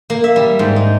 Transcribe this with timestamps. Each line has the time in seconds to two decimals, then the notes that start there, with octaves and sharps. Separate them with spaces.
0.10 A#3
0.24 E5
0.36 G3
0.59 G#2
0.76 D#4